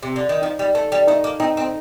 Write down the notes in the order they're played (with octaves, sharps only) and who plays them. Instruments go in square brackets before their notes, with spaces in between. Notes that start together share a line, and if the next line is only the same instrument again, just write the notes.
[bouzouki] C3
D3
D#3
[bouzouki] F3 [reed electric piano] D#4
[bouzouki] G3
[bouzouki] A3 [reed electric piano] A4
[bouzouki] G3
[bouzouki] A3 [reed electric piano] D#4
[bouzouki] A#3
[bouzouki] C4 [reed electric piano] D#4
[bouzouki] C4